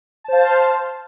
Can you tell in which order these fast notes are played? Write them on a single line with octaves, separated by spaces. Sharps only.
A5 C5 F5